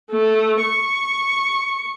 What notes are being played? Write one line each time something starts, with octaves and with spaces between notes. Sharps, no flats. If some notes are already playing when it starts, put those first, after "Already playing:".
A3
C#6